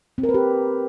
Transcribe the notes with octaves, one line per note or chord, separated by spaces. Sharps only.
C4
A#4
B4
G4